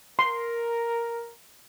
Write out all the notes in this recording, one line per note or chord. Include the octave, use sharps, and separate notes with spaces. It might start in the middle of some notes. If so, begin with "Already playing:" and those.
A#4 C6